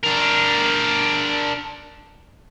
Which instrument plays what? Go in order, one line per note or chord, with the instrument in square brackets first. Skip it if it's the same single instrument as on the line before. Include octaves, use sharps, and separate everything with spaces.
[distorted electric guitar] D4 A#4